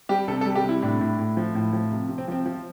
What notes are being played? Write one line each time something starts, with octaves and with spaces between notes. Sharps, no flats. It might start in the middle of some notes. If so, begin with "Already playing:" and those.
G3 G4
C3 A4
A4
G3
G4
C3 E4
A2 D4
A2
A2
F3
A2
F3
C3
C3
C4
F3 C4
F3